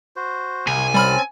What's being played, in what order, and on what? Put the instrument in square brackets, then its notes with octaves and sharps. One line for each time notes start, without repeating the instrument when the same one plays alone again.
[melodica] F#4 C5
[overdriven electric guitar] C2 [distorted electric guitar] G#5
[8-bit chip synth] G3 B5 F6 [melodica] C4 C#4 A5